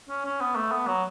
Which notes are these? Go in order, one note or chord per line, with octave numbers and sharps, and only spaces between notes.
C#4
C#4
B3
A3
B3
F#3